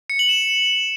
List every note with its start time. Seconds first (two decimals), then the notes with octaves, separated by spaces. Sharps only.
0.10 C#7
0.19 F#7
0.29 E7